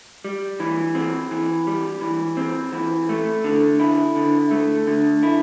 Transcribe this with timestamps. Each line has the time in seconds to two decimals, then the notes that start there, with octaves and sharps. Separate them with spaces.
0.25 G3
0.60 E3
0.95 C4
1.31 E3
1.67 G3
2.01 E3
2.37 C4
2.73 E3
3.09 A3
3.44 D3
3.80 E4
4.16 D3
4.51 A3
4.87 D3
5.23 E4